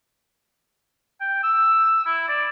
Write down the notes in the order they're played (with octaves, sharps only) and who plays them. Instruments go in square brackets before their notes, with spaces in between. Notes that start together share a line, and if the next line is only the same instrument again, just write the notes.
[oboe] G5
E6
E4
D5